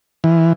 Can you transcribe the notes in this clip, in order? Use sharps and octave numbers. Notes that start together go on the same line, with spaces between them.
E3